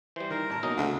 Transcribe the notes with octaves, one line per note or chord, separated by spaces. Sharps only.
E3 G3 C5
D#3 A#4
A1 A5
B2 F#3 A#3 C#4 D#4
D2 C#3